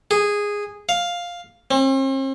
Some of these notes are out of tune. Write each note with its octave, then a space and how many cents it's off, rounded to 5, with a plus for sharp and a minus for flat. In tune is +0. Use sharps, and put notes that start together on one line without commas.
G#4 -10
F5 +5
C4 +45